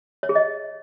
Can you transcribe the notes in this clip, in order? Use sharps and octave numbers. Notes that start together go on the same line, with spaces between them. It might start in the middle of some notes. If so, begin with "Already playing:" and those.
C#5
G#4
D#5